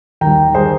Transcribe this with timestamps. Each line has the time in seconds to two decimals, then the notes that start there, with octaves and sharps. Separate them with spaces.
0.21 D#2 D#3 G3 G5 A#5
0.55 D#3 G3 G#4 C5